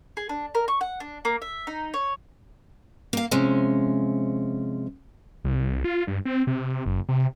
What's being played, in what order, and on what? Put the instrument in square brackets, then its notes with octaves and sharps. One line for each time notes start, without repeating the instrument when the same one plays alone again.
[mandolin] G#4
D4
A#4
C#6
F#5
D4
A#3
E5
D#4
C#5
[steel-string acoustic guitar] A#3 F5
C3 F3 G#3 C#4
[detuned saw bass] C2
F4
G2
C4
C3
F#1
C3